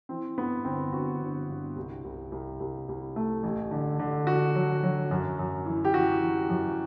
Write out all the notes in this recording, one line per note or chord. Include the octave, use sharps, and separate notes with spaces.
E3 C4
G2 B3
G1 C4
G1 F#4
G1
G2
C2
C2
C2
C2
C2
A3
A1
D3
D3
D3 F#4
F#3
F#3
F#2
F#2
E3
G4
E3 F#4
E3
F#2